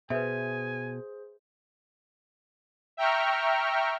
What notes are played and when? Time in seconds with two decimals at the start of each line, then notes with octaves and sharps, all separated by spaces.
0.10 B2 G#4 B4 C5 E5 G#5
2.97 E5 G5 A#5 C#6 F6